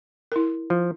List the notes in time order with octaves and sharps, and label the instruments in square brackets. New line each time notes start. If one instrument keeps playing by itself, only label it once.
[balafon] E4 A#4
[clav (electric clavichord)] F3